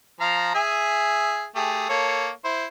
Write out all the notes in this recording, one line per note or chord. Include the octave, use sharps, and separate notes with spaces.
F3 F5 A#5
G#4 E5 G#5
A3 G4 G#4
A#3 A4 C#5
E4 C5